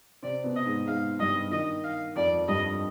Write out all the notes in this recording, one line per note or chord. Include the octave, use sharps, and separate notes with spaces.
C3 C4 D5
B2 B3
D#5
G#2 G#3
G#2 G#3 F5
G2 G3 D#5
D#3 D#5
F5
F2 F3 D5
G2 G3 D#5